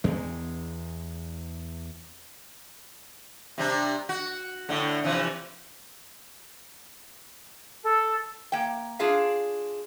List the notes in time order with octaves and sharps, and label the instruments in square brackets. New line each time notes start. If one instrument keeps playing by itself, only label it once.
[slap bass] E2 G#3
[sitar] C3 G3 D4
F#4
A2 D3
C3 E3 F3
[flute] A4
[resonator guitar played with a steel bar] A#3 G5
D4 F4 G#4 F5